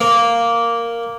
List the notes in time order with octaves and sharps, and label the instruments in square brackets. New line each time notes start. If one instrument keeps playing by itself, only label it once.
[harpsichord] A#3